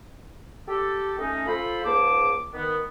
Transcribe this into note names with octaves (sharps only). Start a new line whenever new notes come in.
G4 A4
A3 C#4 D#4
F4 A4 C5 B5
C#2 G#2 A#3 A5 D6
D#3 B3